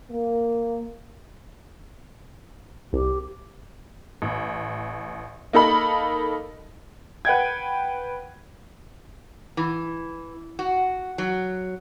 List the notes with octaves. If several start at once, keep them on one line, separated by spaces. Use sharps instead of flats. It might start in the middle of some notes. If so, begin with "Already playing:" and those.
A#3
C2 G4
A1
A#3 D#4 A4 B5
B4 F#5 G5 G#6
E3
F#4
F#3